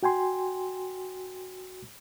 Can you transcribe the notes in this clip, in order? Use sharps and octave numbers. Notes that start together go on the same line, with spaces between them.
F#4 G5 G#5 C6